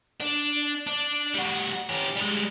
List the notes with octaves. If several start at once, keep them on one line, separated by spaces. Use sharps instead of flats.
D4
D4
G3 F#4
C#4 G4
G3 G#3